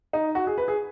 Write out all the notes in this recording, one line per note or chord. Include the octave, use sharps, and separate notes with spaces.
D#4
F#4
G#4
B4
G#4